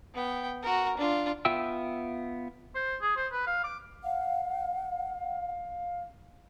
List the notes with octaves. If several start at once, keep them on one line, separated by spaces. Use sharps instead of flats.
B3 G5
F#4 A#4
D4 F4
B3 F4 E5 G5 E6
C5
G#4
C5
B4
F5
D6
F5 F#5